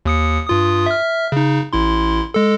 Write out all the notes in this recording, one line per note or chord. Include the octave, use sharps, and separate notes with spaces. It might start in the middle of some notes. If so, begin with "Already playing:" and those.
D#2 D#6 C#7
G2 F4 D#6
E5 F6
C#3 D#4
A1 E4 C6
G#3 A4